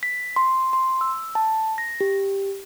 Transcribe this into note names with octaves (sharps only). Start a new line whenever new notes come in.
B6
C6
C6
E6
A5
A#6
G4